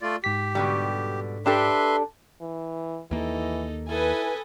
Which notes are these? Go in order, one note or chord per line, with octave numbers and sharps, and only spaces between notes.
A3 F4 D5
G#2 G4 B6
B2 D3 G3
D4 G4 A4 B4 E5 C6
E3
D#2 E3 A#3 D#4 A4
E4 A4 B4 G#5 D#6